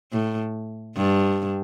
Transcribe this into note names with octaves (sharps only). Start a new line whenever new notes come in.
A2
G2